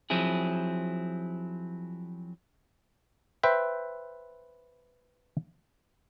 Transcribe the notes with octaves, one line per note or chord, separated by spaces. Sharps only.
F3 F#3 C4 E4 G#4
B4 C5 E5 G5